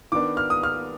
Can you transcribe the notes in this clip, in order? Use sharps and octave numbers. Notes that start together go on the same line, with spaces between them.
D#3 B3 D4 D6
F6
D#6
F6